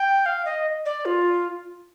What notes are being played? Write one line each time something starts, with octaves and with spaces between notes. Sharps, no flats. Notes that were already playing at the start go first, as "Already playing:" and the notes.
Already playing: G5
F5
D#5
D5
F4